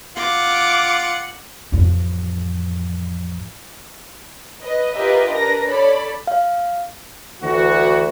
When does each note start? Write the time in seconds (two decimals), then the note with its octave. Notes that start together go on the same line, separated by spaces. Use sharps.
0.17 F4 F#5 D6
1.72 A1 F2
4.62 B4 D#5
4.95 F4 G4 A#4 B4 D#5 E5
5.30 D4 A#4 B4 A#6
5.68 A4 C#5 D5 B5
6.27 F5
7.43 D2 E3 F#4